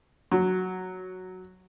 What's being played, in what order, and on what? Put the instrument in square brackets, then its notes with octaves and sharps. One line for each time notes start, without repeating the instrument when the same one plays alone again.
[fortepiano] F#3